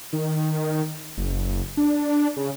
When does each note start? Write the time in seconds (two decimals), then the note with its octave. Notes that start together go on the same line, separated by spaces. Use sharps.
0.13 D#3
1.17 F#1
1.77 D4
2.37 C#3